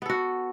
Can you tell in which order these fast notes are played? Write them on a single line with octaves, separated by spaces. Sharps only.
B3 A4 F#4